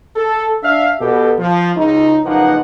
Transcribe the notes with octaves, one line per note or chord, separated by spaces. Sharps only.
A4
D4 E5 F5
B2 B3 G4 A4
F3
C#2 D#4
F#1 F3 A#3 D#4 B4 F#5